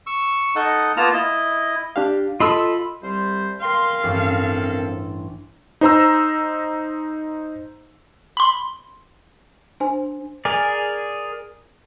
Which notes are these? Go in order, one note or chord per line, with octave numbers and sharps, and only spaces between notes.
C#6 E6
D#4 A4 D#5 F#5
A#3 B3 F4 A5 A#5 F6
E4 D#5
D4 G4 F5
F4 A4 D#5 B5 E6
C2 G3 C5
A#4 F5 G5 C6
A1 G2 F3 C4 A4
D#4 C5 A#5 E6
B5 C6
D4 C5 G#5
G#4 A#4 D5